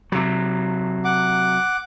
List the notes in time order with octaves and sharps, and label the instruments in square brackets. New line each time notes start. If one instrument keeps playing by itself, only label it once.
[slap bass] C3 F#3
[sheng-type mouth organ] F#5 D6